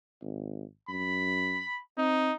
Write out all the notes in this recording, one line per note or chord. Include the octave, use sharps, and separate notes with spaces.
G#1
F#2 B5
C4 D#4